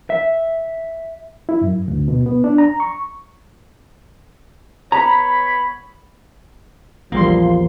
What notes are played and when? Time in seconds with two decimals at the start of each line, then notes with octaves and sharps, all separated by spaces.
0.10 E5
1.49 E4
1.61 F#2
1.88 D2
2.08 B2
2.26 B3
2.44 D4
2.58 A#5
2.80 C#6
4.92 B3 C#5 A#5 B5
7.12 A#1 E2 F3 G3 A#3 C6